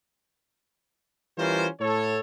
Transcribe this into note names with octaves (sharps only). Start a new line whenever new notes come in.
E3 G3 C#4 F4 A#4 C5
A2 A4 C#5